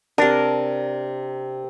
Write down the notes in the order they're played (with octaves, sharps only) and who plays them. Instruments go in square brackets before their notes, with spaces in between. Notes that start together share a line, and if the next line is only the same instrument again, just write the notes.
[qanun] C3 A#4 [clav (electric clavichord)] D4